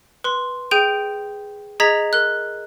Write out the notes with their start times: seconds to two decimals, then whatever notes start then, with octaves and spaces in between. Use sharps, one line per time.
0.24 B4 C6
0.71 G#4 G5 G6 D7 D#7
1.80 G#4 D#5 A#5 G#6 B6 F#7
2.13 A#4 F#6